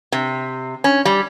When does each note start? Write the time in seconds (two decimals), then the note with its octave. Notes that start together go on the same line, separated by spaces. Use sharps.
0.12 C3
0.84 C#4
1.05 G3